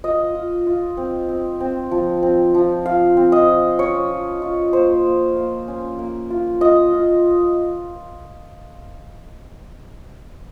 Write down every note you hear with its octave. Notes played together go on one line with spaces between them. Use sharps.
F4 D#5
F4
F4
C4
C4
C4
F3
C4
F3
F4 F5
C4
D#5
F4
C#4 C#5
F4
F4
A#3 C5
A#3
A#3
C#4
A#3
F4
F4 D#5
F4